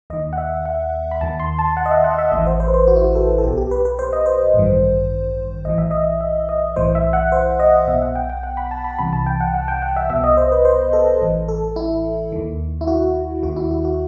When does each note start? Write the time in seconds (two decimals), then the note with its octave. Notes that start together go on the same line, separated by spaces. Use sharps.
0.10 D#2 D#3 D#5
0.33 F#5
0.38 E5
0.65 F#5
1.11 B5
1.21 D#2 D#3 A5
1.40 C6
1.59 A5
1.77 F#5
1.86 D#5
1.91 E5
2.04 F#5
2.18 E5
2.32 A1 A2 E3 D#5
2.46 C5
2.60 C5
2.68 B4
2.74 C5
2.87 F#4
2.96 E4
3.04 F#4
3.15 A4
3.38 A4
3.43 B1 B2 G4
3.57 G4
3.71 B4
3.85 B4
3.99 C5
4.13 D#5
4.26 C5
4.54 A1 G2 D#3
5.65 B1 A2 E3 D#5
5.78 E5
5.91 D#5
6.21 E5
6.49 D#5
6.76 B1 A2 E3 C5
6.95 E5
7.13 F#5
7.32 C5
7.59 D#5
7.87 B1 B2 E5
8.02 F#5
8.15 G5
8.30 G5
8.43 F#5
8.57 B5
8.71 A5
8.84 B5
8.99 C2 C3 E3 B5
9.13 A5
9.26 G5
9.40 F#5
9.54 F#5
9.68 G5
9.82 F#5
9.96 E5
10.10 C2 B2 E5
10.24 D#5
10.37 C5
10.52 B4
10.65 C5
10.93 A4
11.21 A1 A2 E3
11.48 A4
11.76 E4
12.32 D#2 D#3
12.81 E4
12.87 F#4
13.42 D#2 D#3 F#4
13.56 E4
13.71 F#4
13.85 F#4